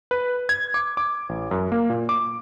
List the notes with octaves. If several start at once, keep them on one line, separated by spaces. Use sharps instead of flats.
B4
G#6
D6
D6
A1
F#2
A#3
A#2
D6